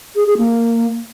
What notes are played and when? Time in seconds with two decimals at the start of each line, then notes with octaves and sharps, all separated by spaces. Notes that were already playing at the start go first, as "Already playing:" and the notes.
0.16 G#4
0.27 G#4
0.38 A#3